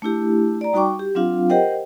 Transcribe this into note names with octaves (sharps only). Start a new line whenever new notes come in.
A3 D4 E4 G4
D5 A#5
G3 D#4 F#4 G5 C#6 D6
G4
F#3 C4 D4 F4 F5
G4 A#4 C5 D#5 F#5 G5